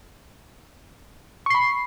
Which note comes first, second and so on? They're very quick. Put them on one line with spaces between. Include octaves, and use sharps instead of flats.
C#6 C7 B5